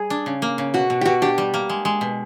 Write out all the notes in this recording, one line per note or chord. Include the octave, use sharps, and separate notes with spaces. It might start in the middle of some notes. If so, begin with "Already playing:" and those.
Already playing: G3 G#4
D4
C#3
A#3
C#3
B2 F#4
B2
B2 F#4 G4
D4 G4
G3
A#3
G#3
G#3
B2